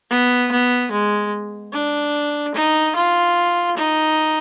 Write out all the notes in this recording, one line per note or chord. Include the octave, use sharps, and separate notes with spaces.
B3
B3
G#3
D4
D#4
F4
D#4